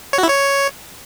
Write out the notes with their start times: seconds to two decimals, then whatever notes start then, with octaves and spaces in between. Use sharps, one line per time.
0.13 C#5
0.18 F#4
0.23 E4
0.28 C#5